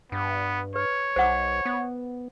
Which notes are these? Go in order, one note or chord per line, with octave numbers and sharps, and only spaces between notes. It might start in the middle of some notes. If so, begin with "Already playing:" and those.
G2 B3
B4 C#5
B1 C5 F#5 D6
B3